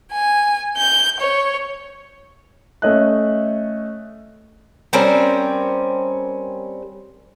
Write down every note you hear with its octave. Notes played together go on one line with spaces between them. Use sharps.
G#5
G6
C#5
A3 C#4 D#5 F#6
G3 C4 C#4 A#4